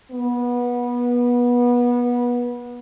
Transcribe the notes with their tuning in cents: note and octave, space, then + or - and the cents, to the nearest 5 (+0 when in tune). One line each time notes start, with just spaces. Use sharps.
B3 -25